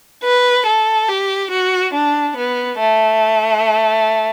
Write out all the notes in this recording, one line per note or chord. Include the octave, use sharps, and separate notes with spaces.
B4
A4
G4
F#4
D4
B3
A3